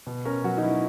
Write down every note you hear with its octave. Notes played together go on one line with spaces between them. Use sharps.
B2
C#4 A#4
F#3 F#4
D#4
F#3 E4